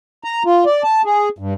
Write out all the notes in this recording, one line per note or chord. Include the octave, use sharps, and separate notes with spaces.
A#5
F4
D5
A5
G#4
G2